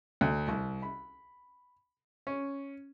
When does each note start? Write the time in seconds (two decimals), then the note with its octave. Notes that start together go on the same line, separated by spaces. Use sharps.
0.21 D2
0.48 C2
0.82 B5
2.27 C#4